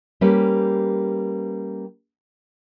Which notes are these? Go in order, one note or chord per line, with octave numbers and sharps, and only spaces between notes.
G3 A#3 C#4 G4 B4